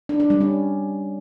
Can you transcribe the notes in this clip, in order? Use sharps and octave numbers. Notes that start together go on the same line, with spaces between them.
D4
D4
G3
C#4